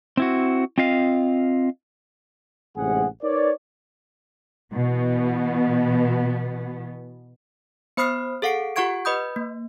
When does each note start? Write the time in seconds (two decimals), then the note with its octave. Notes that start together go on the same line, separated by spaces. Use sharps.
0.17 C4 E4 F#4
0.78 C4 F4 D#5 F5
2.77 A1 G#2 C3 G#3 G#4 F#5
3.23 D#4 A#4 B4 C#5 D5
4.73 B2 E3 B3
7.97 B3 C5 B5 D#6 F6 C7
8.42 G#4 A4 F5 F#5 C7 D7
8.76 F4 G4 F#5 C#6 G#6 D7
9.05 B4 D#5 B5 D#6 G6
9.36 A#3